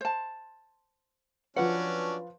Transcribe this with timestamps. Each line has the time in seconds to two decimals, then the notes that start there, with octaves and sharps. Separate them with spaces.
0.01 C5 A5
1.56 F3 F#3 C#4 D4 B4 F#5